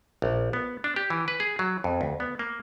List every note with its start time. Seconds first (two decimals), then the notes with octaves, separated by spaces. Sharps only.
0.22 A#1
0.53 B3
0.84 D4
0.96 G4
1.10 E3
1.28 B4
1.40 G#4
1.59 F#3
1.84 F2
2.01 D2
2.20 B3
2.39 A#3